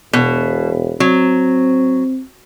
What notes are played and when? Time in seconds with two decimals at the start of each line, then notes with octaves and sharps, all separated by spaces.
0.13 E1 B2
1.00 F#3 C4